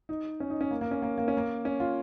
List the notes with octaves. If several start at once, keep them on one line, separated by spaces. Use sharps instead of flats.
D#4
C#4
D#4
C#4
A#3
A#3
C#4
A#3
A#3
C#4
A#3
C#4
F4